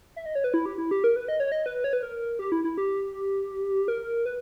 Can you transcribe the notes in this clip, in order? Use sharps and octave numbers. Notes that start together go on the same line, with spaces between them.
E5
D#5
C#5
B4
E4
G4
E4
G4
A#4
B4
D#5
C#5
D#5
B4
C#5
B4
A#4
G4
E4
E4
G4
A#4
B4